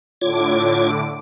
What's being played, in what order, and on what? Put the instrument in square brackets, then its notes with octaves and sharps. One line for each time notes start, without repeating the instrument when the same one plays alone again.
[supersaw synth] A2 D3 D6 [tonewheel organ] F4 C#5